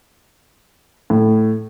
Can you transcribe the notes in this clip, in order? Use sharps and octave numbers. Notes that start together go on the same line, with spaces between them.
A2